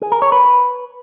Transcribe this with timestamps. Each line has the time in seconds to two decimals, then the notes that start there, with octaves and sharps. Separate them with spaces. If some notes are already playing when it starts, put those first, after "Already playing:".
0.02 G#4
0.12 A#4
0.22 C#5
0.32 B4